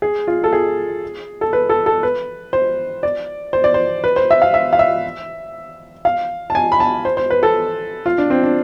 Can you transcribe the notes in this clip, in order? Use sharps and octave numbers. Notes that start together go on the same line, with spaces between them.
G#4
F4
A4
G#4
A4
B4
A4
A4
B4
C5
D5
C5
D5
C5
B4
C5
E5
F5
E5
F5
E5
F5
A5
G#5
B5
A5
C5
C5
B4
A4
F4
D4
C4
D4